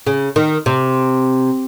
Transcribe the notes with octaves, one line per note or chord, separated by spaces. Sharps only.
C#3
D#3
C3